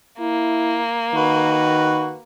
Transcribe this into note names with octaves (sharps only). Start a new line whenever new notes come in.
A#3 E4
D#3 F#4 B4